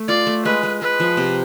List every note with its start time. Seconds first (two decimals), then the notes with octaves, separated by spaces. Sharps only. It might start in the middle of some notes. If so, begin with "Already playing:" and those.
Already playing: A3
0.08 F4 D5
0.27 A3
0.45 G#3 B4
0.63 G#3
0.82 G#3 B4
1.00 F3
1.17 C3